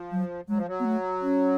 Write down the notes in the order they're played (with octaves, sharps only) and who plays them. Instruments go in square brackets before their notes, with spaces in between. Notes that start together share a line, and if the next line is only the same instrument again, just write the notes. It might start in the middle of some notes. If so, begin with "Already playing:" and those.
Already playing: [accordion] F3
[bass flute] F#3
[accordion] F#3 [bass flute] G#3
[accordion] F3
F#3
[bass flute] B3
A3
C#4